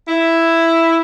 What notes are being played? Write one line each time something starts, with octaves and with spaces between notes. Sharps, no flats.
E4